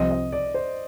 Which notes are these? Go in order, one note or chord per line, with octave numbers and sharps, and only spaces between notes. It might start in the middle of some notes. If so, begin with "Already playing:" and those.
Already playing: C2 C3 F3 C4 D#5
D#5
D5
C5